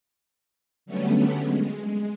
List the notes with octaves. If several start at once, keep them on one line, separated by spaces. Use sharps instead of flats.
D3 F#3 G3 A3 B3 C#4
G#3